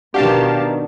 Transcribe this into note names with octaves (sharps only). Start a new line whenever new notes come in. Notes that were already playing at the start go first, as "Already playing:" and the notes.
B2 D#3 D4 F#4 G4 F5 A5